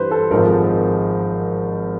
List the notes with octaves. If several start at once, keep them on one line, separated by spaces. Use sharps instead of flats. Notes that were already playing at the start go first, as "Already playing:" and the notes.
Already playing: G2 E3 G3 B4 C5
A4
G#1 G#2 F3 G#3 A#4